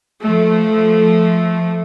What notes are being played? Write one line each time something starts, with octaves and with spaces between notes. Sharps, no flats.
F3 A3